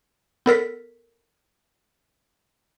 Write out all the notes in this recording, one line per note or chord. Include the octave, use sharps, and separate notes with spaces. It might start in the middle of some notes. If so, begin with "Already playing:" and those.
B3 A4 A#4 B6